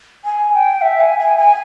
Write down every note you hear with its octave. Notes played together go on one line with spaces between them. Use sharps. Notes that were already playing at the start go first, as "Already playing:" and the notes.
G#5
G5
E5
G#5
G#5
G#5